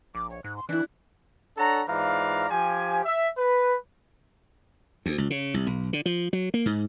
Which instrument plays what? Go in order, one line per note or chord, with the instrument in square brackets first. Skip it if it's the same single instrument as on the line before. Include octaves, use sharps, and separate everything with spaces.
[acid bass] A#1 [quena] D6
[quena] C#5
[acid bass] G#2 [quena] F#6
[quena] C6
[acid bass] E3 [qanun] D4 E4 [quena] F#6
[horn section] D4 A4 C#5 F#5 A#5
G#2 E3 F4 D5 F5 A#5
F3 G4 G#5
E5
B4
[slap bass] D2
C#2
C#3
C2
B1
D3
F3
F#3
A#3
G#2